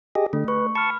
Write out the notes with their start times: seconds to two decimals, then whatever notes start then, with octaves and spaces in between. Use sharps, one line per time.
0.15 G4 G#4 D#5
0.33 D3 A3
0.48 B4 C#6
0.75 A5 B5 C#6 F6